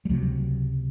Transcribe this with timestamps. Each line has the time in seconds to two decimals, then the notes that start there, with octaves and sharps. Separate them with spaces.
0.05 G3
0.09 C#2 C3 F#3